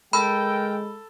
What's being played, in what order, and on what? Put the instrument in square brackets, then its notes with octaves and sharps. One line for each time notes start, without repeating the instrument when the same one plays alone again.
[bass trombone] G#3 [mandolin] A4 E6 [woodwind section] A#4 G5 [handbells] B5